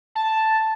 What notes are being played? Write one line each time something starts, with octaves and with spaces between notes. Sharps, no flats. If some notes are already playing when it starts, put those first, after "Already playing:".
A5